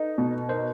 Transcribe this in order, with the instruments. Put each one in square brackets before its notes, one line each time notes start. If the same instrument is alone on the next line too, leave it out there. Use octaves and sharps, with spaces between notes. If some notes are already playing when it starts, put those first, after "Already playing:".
Already playing: [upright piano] D#4 [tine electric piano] A4 B4
[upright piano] B2
[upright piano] D#4 [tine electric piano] A#4 C5